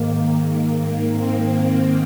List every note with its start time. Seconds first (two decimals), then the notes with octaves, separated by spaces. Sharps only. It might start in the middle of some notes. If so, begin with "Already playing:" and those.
Already playing: G#2 D#3 A#3
0.69 G#2 D#3
1.12 C4
1.55 C4